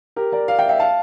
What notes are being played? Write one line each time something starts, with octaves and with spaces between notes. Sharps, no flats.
G4 A#4
A#4 D5
D5 F5
E5 G5
E5 G5
F5 A5